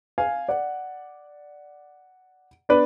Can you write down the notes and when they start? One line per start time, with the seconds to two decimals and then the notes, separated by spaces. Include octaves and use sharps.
0.18 F5 G#5
0.48 D5 F#5
2.69 B3 D4 B4 D5